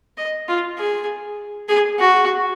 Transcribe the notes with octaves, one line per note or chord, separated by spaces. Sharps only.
D#5
F4
G#4
G#4
F#4